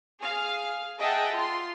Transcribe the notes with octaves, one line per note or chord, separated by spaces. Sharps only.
G#4 F5 F6
G#4 D#5 E5 F#5 G5 A5
F4 C6